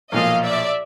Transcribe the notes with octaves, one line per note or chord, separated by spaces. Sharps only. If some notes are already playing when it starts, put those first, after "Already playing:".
B1 A#2 F3 D#5 F5
D5 E5